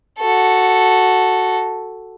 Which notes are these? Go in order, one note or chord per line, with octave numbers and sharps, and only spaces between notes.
F#4 A4